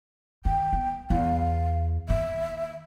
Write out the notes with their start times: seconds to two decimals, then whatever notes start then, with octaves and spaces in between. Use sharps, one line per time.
0.45 D#3 G5
0.73 B3
1.10 E2 F5
2.09 D#3 A#3 E5